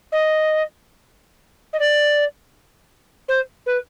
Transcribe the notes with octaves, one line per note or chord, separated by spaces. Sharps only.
D#5
D#5
D5
C5
B4